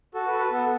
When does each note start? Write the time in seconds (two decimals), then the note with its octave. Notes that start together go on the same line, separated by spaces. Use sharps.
0.14 F#4 A4
0.27 B4
0.33 A4
0.39 B4
0.51 B3 A4